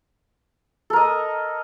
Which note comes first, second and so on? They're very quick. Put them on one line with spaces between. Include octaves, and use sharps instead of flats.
A4 A#4 D#5